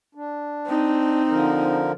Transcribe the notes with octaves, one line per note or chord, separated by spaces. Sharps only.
D4
C4 D#4
D3 F3 A#4